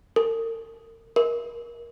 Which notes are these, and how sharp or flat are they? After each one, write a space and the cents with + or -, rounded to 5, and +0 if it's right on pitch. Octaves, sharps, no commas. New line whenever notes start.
A#4 -40
A#4 +25